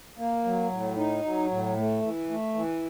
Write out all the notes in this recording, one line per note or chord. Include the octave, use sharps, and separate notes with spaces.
A#3
F#3
A2
D#4
F#3
A2
A3
E3
A3
E3